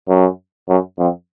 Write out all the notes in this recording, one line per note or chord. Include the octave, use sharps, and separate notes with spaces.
F#2
F#2
F2